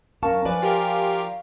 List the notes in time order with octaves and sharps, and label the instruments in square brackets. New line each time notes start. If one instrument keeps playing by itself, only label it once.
[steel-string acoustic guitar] F#2 C#4 A5 [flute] A#4 [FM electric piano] F5 C#6
[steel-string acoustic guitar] F3 D5 [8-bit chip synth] B4 [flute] G#5
[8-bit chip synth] F4 G4 A#4